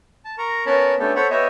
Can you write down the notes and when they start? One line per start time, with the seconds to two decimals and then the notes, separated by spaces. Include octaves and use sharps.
0.25 A5
0.38 A#4 A#5 C#6
0.66 B3 C#4 A#4 C#5 A5 B5
0.99 A3 B3 C#4 D4 G4 A4
1.16 A4 C5 C#5 F#5 B5 C#6
1.30 B3 G4 C#5 D#5 E5